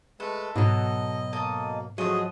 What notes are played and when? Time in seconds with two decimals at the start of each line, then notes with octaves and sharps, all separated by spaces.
0.20 G#3 A3 A4 B4
0.56 G#2 B2 F#3 D#5
1.33 A#3 A4 D#5
1.98 F3 F#3 A3 F#4 G#4 D#5